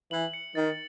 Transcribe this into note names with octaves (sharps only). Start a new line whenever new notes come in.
E3 F#7
C#7
D#3 A6